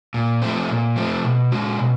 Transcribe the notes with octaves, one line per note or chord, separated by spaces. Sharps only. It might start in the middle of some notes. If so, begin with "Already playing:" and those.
A#2
F3 A3 C4
A#2
F3 A3 C4
B2
G#3 C#4 F#4
B2